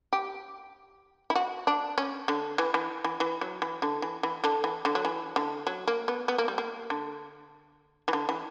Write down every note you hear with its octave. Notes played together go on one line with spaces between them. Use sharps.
G4
E4
F#4
D4
C#4
D3
E3
E3
E3
E3
F#3
E3
D3
E3
E3
D3
E3
D3
F#3
E3
D3
F#3
A#3
B3
B3
A#3
G3
A#3
D3
E3
D3
E3